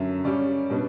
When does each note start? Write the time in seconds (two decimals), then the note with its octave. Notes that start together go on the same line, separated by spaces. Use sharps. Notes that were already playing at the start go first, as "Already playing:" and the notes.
Already playing: F#2 D3 F#3 E5
0.24 C#3 G3 C#4 D5
0.70 B2 G3 B3 D4